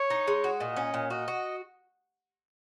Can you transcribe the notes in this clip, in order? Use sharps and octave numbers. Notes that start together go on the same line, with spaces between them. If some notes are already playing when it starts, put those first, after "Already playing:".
Already playing: C#5
D#4
G#3
F#4
A#2 D#5
C#4
A#2
F#4 D#5
F#4